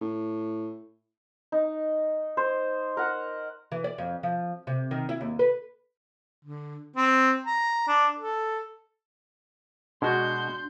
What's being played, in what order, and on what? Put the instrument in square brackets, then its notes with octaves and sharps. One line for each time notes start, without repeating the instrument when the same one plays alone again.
[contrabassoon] A2
[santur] D#4
C5
A#4 F#5
[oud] E3
D5
F2
F3
C3
D#3
E4
D#2
B4
[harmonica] D3
C4
A#5
D4
A4
[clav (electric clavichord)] B2 [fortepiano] G#3 F#4 [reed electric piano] D4 [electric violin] C6 G6